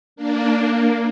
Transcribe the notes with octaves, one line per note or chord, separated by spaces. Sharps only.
A#3 D4
A#3